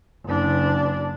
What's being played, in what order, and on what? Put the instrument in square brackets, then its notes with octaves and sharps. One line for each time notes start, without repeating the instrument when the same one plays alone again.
[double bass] F#1 D4